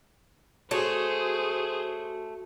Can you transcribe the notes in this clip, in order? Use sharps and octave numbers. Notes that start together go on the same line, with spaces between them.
A3 F#4 G#4 C5 C#5